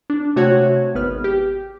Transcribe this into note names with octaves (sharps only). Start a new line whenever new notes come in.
D4
C3 A3 F#4 C#5 F#5 G#6
G#1 B3 B4 F6
G4